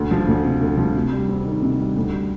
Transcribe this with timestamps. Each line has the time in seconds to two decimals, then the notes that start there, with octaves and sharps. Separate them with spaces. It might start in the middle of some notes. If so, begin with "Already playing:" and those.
Already playing: D2
0.11 F3
0.28 D2
0.44 C3
0.61 D2
0.78 F3
0.95 C3
1.12 G3
1.29 C4
1.45 D#3
1.62 C3
1.80 G3
1.97 D2
2.13 G3